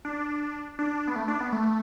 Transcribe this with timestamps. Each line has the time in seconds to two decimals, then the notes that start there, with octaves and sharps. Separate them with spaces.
0.05 D4
0.79 D4
1.07 B3
1.16 A3
1.28 D4
1.40 B3
1.52 A3